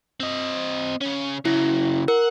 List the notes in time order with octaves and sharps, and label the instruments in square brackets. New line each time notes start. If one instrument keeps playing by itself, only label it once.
[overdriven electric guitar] C4 D#5
C#3 C#4
[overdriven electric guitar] C#3 F#3 [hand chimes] E4
[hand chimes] A#4 [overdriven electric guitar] F#5